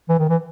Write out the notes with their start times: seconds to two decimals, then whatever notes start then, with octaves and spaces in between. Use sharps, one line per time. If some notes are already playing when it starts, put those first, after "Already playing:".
0.09 E3
0.19 D#3
0.29 E3